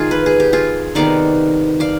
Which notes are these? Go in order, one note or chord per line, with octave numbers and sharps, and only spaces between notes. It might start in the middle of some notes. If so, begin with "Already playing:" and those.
Already playing: D#3 G#3 D#4 F4 G#4
B4
G#4
G4
F4 G#4
C3 D#3 B3 D#4 D5 F5
D5 F5